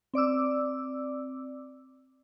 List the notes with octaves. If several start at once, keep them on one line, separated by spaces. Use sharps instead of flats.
C4 D5 D6 E6